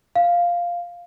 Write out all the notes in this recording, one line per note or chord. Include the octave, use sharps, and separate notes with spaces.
F5